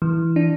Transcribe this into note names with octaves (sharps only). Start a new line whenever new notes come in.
E3
D4